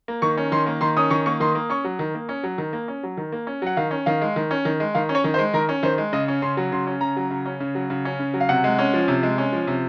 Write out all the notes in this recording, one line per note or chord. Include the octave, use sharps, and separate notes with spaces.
A#3
D#3 C#6
C#4
D#3 C6
A#3
D#3 C6
C#4 D#6
D#3 C#6
A#3 C#6
D#3 C6
A#3
C#4 C#6
F#3
D#3
A#3
C#4
F#3
D#3
A#3
C#4
F#3
D#3
A#3
C#4
F#3 F#5
D#3 F5
C#4
D#3 F5
G#3
D#3
C#4
D#3
G#3
D#3 F5
C#4
C#5
D#3
C5
G#3
D#3 A#4
C#4
D#3 C5
G#3
C#3 D#5
C#4
C#3 C6
F#3
C#3 C6
C#4
C#3 A#5
F#3
C#3
C#4
C#3
F#3
C#3
C#4
C#3
F#3
F5
C3 F#5
G#3
C#4
F3
C3
G#3
C#4
F3
C3